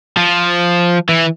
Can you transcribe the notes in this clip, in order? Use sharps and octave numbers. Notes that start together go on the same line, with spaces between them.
F3
E3